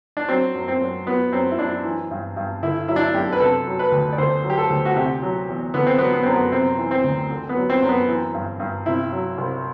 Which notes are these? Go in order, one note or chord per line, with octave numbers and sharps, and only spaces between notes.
D4
F#3 C4
F#2
C4
F#2
F#3 B3
F#2 C4
E4
F#2 D4
E3
G2
G2
D3 E4
F#3 E4
D4
E4
F#2 G4
B4
C3 A4
F#3
B4
D2
D5
D3 C5
F#3
G4
A4
D2
F#4
C3 G4
F#3
E2
D3 B3
C4
F#3 B3
B3
F#2 C4
B3
C3 C4
E3
C4
D2
D3
B3
F#3
C4
F#2
B3
E3
G2
G2
C3 E4
F#3
C2